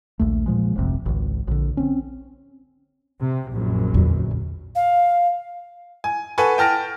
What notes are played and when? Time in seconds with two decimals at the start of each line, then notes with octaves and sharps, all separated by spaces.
0.20 A#1 D#2 A3
0.46 A#2 F3 G#3
0.75 D1 A1 F2 C3
1.06 G#1 C#2
1.48 A#1 D3
1.77 C4 C#4
3.20 C3
3.50 A#1 F#2
3.94 E2 D3
4.75 F5
6.04 G#5
6.38 A4 B4 F#5 G#5 C#6
6.58 G5 A5 F6 A#6 D7